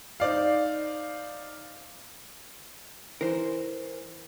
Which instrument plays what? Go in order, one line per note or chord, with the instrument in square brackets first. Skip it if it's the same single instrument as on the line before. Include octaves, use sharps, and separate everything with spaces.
[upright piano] D#4 C5 D5 F5
[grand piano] E3 [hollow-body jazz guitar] A#4 C5